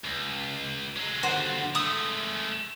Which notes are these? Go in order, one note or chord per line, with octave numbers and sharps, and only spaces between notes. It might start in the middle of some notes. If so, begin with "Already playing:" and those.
C#2
F#3 G#3
D#2 D3 F#4 C5
G#3 A3 D#6 E6